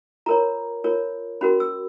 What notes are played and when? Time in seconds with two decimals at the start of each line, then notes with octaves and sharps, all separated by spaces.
0.26 F4 A#4 C#5 A#5
0.84 F4 A#4 C#5
1.41 C#4 F#4 A#4 B5
1.60 E6